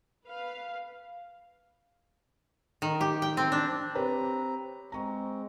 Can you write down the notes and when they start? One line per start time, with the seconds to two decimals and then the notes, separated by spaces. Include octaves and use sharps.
0.25 B4 F5
2.82 D#3
3.01 G4
3.22 G5
3.37 C4
3.52 D4
3.95 C4 G4 B4 C#5 A#5
4.92 G#3 C4 A#5 C#6